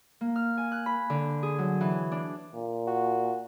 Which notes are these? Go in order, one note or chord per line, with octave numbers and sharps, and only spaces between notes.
A#3
F6
G#5
F#6
B5
D3
G#4
F#3
E3
D4
A#2
F#4